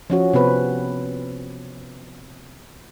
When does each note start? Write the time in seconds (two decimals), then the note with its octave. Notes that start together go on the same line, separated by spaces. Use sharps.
0.10 F3 C#4 F#4
0.33 C3 B3 C4 B4